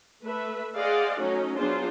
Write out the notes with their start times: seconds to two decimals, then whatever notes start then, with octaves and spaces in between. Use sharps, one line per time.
0.24 A3 B4 E5
0.76 G#4 C5 D5 D#5 F5 F#5
1.21 F#3 A3 C#4 D#4 F#4
1.57 F#3 B3 D4 F4 G#4 C5